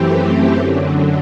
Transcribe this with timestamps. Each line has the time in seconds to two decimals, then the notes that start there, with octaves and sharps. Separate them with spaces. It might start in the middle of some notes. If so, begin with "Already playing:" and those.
Already playing: F#2 E3 A3 C4 G4
0.55 F#2 D3 F#3